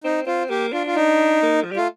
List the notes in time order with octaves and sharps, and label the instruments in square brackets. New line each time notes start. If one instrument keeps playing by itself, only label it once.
[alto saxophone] C4 [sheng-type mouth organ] D#4
[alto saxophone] C4 [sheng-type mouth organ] F4
[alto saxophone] A#3 [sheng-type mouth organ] G4
[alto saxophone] D4 [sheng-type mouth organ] F4
[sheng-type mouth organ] F4
[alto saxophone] D4 [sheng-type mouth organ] D#4
[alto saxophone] A#3
F3
G3
[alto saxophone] A3 [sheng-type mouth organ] F4